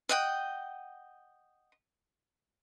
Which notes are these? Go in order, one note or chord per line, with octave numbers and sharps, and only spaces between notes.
D#5 F#5 G5